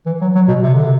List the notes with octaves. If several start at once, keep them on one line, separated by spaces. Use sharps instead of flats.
E3
F#3
F#3
B2
C3
D3
C3